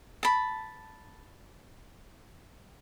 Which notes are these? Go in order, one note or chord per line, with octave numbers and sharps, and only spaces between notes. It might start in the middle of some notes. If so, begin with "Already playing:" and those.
A5 B5